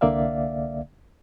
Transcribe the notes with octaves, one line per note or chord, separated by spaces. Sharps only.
C2 D3 A#3 D5 E5 F5